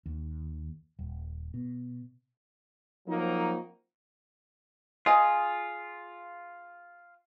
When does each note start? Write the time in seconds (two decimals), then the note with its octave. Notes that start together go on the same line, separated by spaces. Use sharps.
0.06 D#2
0.99 D#1
1.54 B2
3.07 F3 F#3 A#3 C4 D#4
5.06 F4 G#4 D#5